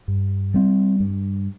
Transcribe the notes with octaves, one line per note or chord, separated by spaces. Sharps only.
G2
G3 C4
G2